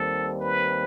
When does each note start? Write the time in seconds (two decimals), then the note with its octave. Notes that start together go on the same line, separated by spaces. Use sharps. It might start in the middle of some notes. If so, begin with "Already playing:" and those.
Already playing: D#2 D#3 G3 C4 A4
0.40 B4